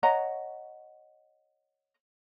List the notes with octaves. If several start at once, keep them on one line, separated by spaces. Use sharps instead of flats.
C#5 D#5 F#5 A#5